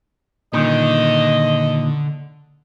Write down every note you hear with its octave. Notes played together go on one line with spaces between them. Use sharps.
A#2 D3 D#3 D#5